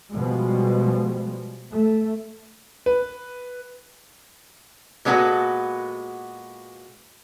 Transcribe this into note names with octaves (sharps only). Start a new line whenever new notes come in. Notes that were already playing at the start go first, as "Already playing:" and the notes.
B2 F3 G3 G#3
A3
B4
A#2 G#3 B3 C#4 F#4 A4